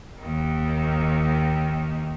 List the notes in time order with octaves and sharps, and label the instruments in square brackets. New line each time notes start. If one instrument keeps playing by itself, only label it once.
[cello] D#2 D#3